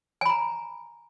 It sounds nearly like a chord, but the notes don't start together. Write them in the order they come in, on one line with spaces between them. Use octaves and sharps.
G#5 B5 A#5